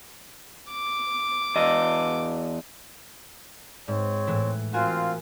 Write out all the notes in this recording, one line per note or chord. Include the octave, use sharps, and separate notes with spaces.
D6
E2 D#5
G#2 C4 C#5
A2 E3 E4
C4 F4 F#4 A#4 F5 G#5